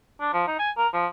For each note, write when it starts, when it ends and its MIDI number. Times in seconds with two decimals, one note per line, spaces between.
0.20 0.32 62
0.33 0.42 53
0.47 0.54 63
0.59 0.70 80
0.77 0.88 70
0.94 1.07 53